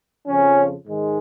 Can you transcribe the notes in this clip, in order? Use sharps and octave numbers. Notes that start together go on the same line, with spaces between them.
F2 C#3 F3 C#4
G#2 D#3 G#3